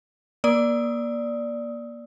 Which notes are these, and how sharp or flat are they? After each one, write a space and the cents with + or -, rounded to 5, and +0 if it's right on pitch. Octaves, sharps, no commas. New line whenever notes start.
A#3 +30 D5 +0 D#6 +25